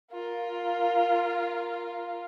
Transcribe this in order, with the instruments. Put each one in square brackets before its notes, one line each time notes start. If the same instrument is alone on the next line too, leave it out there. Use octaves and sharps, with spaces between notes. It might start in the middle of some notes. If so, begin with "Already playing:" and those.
[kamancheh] F4 A#4